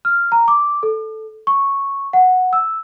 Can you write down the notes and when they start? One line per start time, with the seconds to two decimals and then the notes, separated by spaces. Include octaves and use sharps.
0.05 F6
0.32 A#5
0.48 D6
0.83 A4
1.47 C#6
2.13 F#5
2.53 E6